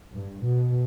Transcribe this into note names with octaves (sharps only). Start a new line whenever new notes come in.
G2
B2